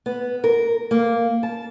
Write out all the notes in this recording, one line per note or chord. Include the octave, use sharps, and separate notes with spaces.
B3
A#4
A#3
A5